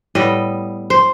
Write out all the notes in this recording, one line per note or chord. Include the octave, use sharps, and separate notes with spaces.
A2 G3 B3 D#5
C5